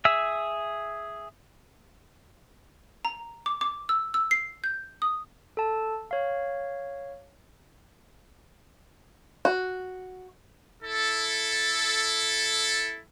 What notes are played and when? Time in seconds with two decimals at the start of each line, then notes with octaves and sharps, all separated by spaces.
0.05 G#4 E5 E6
3.05 A#5
3.46 D6
3.61 D6
3.89 E6
4.14 E6
4.31 C7
4.64 G6
5.02 D#6
5.57 A4 A5
6.11 C#5 F5
9.45 F#4
10.83 E4 A4